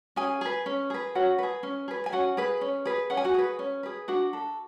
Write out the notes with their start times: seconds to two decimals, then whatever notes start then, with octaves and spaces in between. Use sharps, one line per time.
0.16 C#4 G#4 G#5
0.41 G#4 B4
0.66 C#4
0.90 G#4 B4
1.15 C#4 F#4 F#5
1.39 G#4 B4
1.63 C#4
1.88 G#4 B4
2.06 G#5
2.12 C#4 F#4 F#5
2.37 G#4 B4
2.61 C#4
2.85 G#4 B4
3.10 C#4 F#5
3.17 G#5
3.24 F#4 F#5
3.34 G#4 B4
3.59 C#4
3.83 G#4 B4
4.08 D4 F#4 F#5
4.33 A4